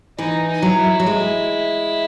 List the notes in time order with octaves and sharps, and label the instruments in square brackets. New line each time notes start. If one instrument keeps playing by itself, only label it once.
[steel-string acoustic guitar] E3 [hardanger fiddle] D#4
[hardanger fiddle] D#4
[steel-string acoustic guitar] F#3
[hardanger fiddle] E4
[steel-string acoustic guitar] F#3
G#3